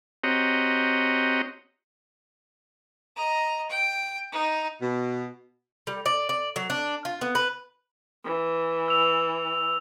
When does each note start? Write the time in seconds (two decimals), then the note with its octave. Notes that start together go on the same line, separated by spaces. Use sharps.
0.24 C4 F#4 G4 C#5 D#5 A#5
3.16 D#5 A#5
3.70 G5
4.32 D#4
4.82 B2
5.87 G3
6.06 D5
6.29 D5
6.56 F#3
6.70 D4
7.05 F4
7.21 B3
7.35 B4
8.24 E3
8.88 E6 F7